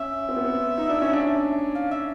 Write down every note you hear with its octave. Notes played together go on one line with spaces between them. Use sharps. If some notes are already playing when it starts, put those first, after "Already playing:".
Already playing: C#4 E5
C4
B3
C4
D#4
D4
C#4
D4
F5
E5